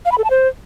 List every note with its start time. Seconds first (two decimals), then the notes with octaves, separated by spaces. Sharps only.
0.05 F5
0.12 B5
0.18 A4
0.24 A5
0.30 C5